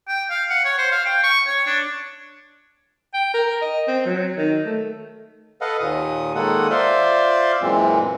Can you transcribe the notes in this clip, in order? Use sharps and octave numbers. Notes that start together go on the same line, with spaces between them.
G5
F5
F#5
C#5
C5
F5
G5
C#6
C#5
D4
G5
A#4
D#5
C4
F#3
D#3
A3
A4 B4 D#5 F5 F#5
D#2 A#2 D#6
D#3 G#3 A#3 A4 F#5 D#6
F4 C5 D5 E5 F5 C6
F#2 A#2 E3 G#3 C4